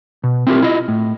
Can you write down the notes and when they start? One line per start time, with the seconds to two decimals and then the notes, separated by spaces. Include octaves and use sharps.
0.24 B2
0.47 C4 E4 F4 G4 A#4
0.62 E4 F4 D#5
0.88 A2